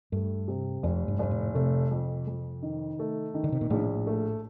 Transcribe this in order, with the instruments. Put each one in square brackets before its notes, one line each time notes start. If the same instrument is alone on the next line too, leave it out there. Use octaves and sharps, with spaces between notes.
[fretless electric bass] G2 [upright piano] A3
[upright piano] C3
[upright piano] F1 [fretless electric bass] F2
[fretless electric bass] G2
[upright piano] F1 [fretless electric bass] G2
[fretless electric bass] A2
[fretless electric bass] C3 [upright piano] A3
[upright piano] F2
F2
D#3
A3
D#3
[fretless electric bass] D3
C3
A#2
[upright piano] A#1 [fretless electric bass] A2
[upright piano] A3